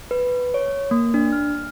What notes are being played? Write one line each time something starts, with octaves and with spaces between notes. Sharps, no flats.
B4
C#5
A#3
D4
F6